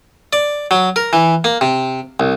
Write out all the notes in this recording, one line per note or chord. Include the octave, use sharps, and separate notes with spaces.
D5
F#3
A#4
E3
A#3
C3
C2